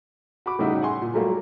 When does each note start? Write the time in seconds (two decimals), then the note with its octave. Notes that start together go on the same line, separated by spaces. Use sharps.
0.46 F#4 B5 D6
0.59 A2 C#3 G3 D#4 E4 F#4
0.81 F#5 G#5 C6
1.01 A#2
1.14 F#3 G3 A3 A#3 F4